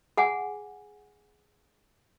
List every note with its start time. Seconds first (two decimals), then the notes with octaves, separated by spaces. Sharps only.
0.17 G#4 F#5 G#5